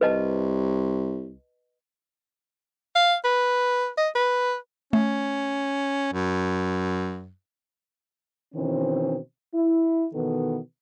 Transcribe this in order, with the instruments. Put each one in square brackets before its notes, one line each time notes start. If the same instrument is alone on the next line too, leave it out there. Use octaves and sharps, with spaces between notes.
[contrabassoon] C2 [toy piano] B4 D#5 A5
[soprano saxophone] F5
B4
D#5
B4
[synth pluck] A3 [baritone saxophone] C#4
[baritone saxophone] F#2
[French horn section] B2 D#3 E3 C4 C#4 C5
E4
B2 D#3 E3 B3 A4 B4